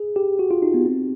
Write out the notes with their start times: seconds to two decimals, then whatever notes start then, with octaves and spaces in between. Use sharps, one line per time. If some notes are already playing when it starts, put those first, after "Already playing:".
Already playing: G#4
0.16 G4
0.39 F#4
0.51 F4
0.62 D#4
0.74 B3
0.86 C4